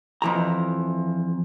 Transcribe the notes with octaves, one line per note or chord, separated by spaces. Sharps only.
F2 E3 A#5